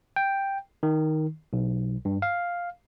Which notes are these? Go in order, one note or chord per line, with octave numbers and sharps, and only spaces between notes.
G5
D#3
B1
G2
F5